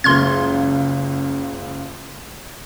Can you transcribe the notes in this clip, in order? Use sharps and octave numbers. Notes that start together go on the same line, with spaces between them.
F#1 C#2 C#3 C6 F6 G#6